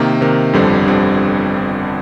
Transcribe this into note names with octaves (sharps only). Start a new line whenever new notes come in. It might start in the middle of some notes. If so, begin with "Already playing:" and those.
Already playing: C3 D#3 A#3
C3 D#3 A#3
G1 F2 D3 G3 C4
G1 F2 D3 G3 C4